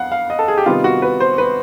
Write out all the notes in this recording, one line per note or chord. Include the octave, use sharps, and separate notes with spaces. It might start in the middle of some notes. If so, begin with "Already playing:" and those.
Already playing: F2 B3 F5 F#5
F5
D#5
A4
G#4
G4
C3 D#3 G3 B3 D#4 F4
F#4
B4
C5
B4